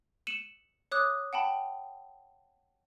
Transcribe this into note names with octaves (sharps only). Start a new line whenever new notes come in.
C#7 D#7 E7 F#7
C#5 D6 D#6 F#6
F#5 G5 A5 B5